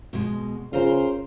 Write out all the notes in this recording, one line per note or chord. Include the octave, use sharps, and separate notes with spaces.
B2 G#3
C#3 F4 A#4 C5